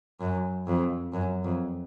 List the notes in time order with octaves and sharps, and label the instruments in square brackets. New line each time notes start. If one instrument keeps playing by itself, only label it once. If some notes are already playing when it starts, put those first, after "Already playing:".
[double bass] F#2
F2
F#2
F2